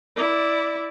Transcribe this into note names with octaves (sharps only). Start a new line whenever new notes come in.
E4 D5